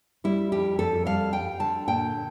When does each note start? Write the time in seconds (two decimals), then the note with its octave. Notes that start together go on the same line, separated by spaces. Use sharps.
0.24 G3 E4
0.52 F2 G4
0.79 F2 A4
1.06 G3 F5
1.33 G3 G5
1.60 D3 A5
1.88 A#2 G5